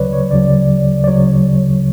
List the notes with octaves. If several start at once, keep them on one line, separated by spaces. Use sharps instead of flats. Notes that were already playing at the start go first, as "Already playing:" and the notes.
Already playing: D2 C#3 F#3 B4 C#5 D5
C#5
D2 C#3 F#3 D5
D5
D2 C#3 F#3 C#5